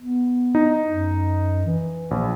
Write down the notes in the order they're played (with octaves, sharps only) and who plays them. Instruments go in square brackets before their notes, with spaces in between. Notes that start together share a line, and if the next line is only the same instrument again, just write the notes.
[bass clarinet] B3
[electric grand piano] D#4
[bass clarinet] F#2
E3
[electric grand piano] A#1